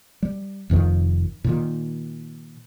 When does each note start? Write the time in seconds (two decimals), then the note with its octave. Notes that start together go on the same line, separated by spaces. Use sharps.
0.22 G3
0.70 F1 F2 D#3
1.44 A#2 D#3